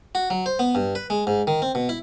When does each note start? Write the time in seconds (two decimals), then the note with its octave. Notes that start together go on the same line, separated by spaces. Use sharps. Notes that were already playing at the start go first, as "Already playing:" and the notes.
0.15 F#4
0.30 F#3
0.46 C5
0.59 B3
0.75 G2
0.95 B4
1.10 G#3
1.27 G#2
1.47 D#3
1.62 C4
1.75 B2
1.89 E4